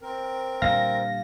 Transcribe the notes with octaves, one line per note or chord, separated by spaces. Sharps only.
C4 A#4
A#2 D3 G3 F5 A#6